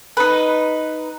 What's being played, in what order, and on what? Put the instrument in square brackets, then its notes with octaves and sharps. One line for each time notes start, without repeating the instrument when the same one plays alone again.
[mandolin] D#4 B4